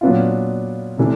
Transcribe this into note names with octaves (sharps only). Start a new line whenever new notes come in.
A#2 F#3 B3 D4 F4
C3 E3 A3 D4